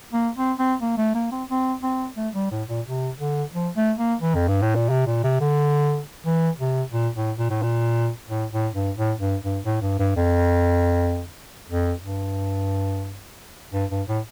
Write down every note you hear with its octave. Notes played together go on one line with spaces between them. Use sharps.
A#3
C4
C4
A#3
A3
A#3
C4
C4
C4
A3
G3
A2
A#2
C3
D3
F3
A3
A#3
E3
F2
G2
A2
A#2
C3
A#2
C3
D3
E3
C3
A#2
A2
A#2
A2
A#2
A2
A2
G2
A2
G2
G2
A2
G2
G2
F2
F2
G2
G2
G2
A2